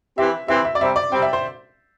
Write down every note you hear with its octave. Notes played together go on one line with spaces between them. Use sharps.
E3 C4 G4 E5
E3 C4 G4 E5
E5
D5
C3 G3 C4 E5
D5
C3 G3 C4 G5
E5
C5